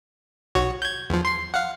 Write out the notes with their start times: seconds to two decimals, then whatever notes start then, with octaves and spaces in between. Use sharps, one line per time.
0.55 B1 F#4 C#5
0.82 G6 G#6
1.10 E2 F3
1.25 C6 C7
1.54 F5 F#5